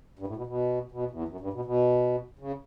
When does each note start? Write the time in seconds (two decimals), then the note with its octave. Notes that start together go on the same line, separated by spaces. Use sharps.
0.19 G2
0.27 A2
0.36 B2
0.47 B2
0.92 B2
1.11 E2
1.28 F#2
1.40 G2
1.53 B2
1.65 B2
2.39 C#3